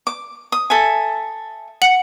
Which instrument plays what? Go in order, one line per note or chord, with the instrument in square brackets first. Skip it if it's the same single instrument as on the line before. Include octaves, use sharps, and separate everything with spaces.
[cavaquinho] D6
D#6
A4 E5 G#5
[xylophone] F#5 C#7 F#7